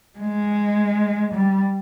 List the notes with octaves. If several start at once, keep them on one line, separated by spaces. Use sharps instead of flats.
G#3
G3